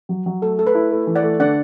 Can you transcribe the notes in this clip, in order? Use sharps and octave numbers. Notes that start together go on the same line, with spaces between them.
F#3
F#3
A3 A4
A3 A4
B4
E4
A3
E3
D5 F#5
A3
D3 D5 F#5